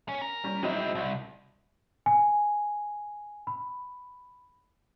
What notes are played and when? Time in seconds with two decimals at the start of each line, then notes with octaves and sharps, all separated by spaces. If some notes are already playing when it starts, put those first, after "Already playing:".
0.09 C#4
0.22 A#4
0.44 G3 C#4
0.63 F#3 G#3 C4 D#4 E4
0.95 C2
2.06 G#5
3.47 B5